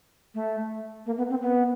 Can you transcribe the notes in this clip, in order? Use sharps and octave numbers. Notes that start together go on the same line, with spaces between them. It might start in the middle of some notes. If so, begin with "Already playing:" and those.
A3
A#3
B3
C4
B3